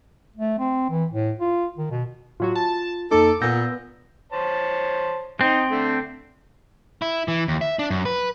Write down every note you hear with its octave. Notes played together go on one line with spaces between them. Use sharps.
A3
C4
E3
A2
F4
D#3
B2
A2 F#3 F4 F#4
A5
F2 A#3 D#4 A4 D6
A#2 B3 E6 G6 A#6
C5 C#5 A5
C4 D#4
D3 A3
E4
E3
D#2
E5
D4
F#2
B4